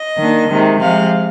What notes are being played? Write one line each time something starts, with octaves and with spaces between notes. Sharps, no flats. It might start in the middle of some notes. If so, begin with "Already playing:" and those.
Already playing: D#5
D#3 A#3 D4
C3 D#3 G#3
C3 F3 G#3 F5